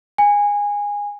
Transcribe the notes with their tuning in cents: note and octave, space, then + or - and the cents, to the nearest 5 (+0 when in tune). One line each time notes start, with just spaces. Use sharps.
G#5 -20